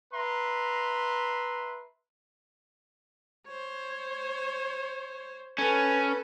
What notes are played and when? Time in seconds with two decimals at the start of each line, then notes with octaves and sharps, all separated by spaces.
0.14 B4 E5 A#5 C6
3.48 C5 C#5
5.58 C#4 A4 B4